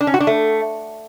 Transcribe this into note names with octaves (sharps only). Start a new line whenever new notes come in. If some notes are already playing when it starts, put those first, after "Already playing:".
D4
C#4
F#4
D4
A3